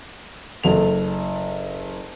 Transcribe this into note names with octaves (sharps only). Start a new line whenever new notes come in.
F#1 A4 F7